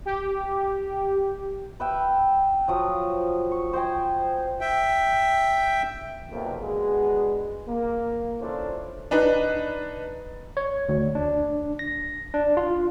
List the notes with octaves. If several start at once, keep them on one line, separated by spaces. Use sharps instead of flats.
G4
B4 E5 G5
F3 F#3 D#6
C#6
C5 D#5 G5 G#5
E5 G5
B1 F2 C3 A#3
G#3 B3 D4 F#4 G#4
A#3
C#4 D4 E4 F4 A4 C5
D4 D#4 B4
C#5
D2
D4
A#6
D4
F4